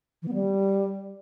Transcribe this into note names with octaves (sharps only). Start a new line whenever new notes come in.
E3
B3
G3